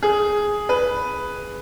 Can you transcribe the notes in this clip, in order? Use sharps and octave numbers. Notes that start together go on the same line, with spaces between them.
G#4
B4